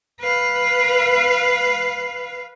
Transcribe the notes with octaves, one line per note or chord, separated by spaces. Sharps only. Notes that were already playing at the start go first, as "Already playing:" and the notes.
B4 F5